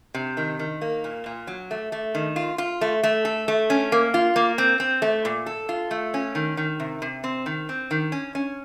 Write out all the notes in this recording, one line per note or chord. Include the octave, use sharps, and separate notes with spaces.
C3
D#3
D#3
A#3
A#2
A#2
F#3
A3
A3
D#3
F4
F4
A3
A3
A4
A3
C#4
A#3
F4
A#3
C4
C4
A3
A#2
A4
F4
A3
C#4
D#3
D#3
C3
C3
C4
D#3
C4
D#3
C#4
C#4